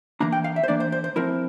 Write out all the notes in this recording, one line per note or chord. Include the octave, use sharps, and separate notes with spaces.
E3 A#3 D4 A#5
G5
F5
E5
C5
E3 A#3 D4 D5
C5
C5
C5
F3 C4 E4 A#4